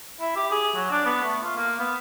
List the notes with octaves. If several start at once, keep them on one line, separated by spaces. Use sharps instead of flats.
E4
G4
G#4
F#3
D4
B3
A3
F4
A#3
B3